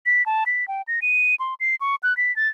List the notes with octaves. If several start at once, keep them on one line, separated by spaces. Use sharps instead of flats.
B6
A5
B6
G5
A#6
D#7
C6
C7
C#6
F#6
B6
A6